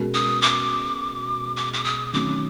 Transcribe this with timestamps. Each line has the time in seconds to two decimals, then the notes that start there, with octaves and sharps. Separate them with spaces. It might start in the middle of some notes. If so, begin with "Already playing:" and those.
Already playing: B2 G#3 C#4 F#4 A#4
0.14 D#6
0.42 D6
1.57 D6
1.74 D6
1.84 D#6
2.13 D#3 F#3 A3 C#4 D6